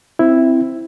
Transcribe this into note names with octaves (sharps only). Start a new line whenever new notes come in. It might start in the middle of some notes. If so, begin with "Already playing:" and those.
C4 E4